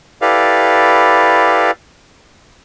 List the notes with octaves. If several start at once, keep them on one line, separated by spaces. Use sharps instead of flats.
E4 G4 A4 B4 D5 F5